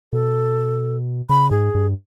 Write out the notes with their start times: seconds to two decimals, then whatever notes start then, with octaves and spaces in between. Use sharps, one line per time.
0.13 B2 A4
1.29 C#3 B5
1.51 G#2 G#4
1.75 G2